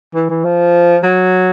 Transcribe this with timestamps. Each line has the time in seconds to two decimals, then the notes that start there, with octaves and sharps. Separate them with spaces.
0.15 E3
0.30 E3
0.45 F3
1.04 F#3